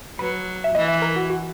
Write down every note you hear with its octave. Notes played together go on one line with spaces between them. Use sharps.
F#3 B4
E5
E3 D#5
E5
A#4
F#4
F#4